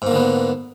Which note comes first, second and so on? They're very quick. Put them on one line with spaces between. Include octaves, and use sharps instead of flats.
G#2 A#3 D3 B3